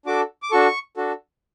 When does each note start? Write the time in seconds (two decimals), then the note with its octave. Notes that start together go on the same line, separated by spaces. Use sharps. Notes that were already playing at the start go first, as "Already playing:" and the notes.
0.06 D4 F#4 A4 D6
0.42 D6
0.51 D4 F#4 A4 C#6
0.97 D4 F#4 A4